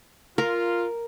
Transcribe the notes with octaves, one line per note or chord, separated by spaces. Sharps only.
F4 A#4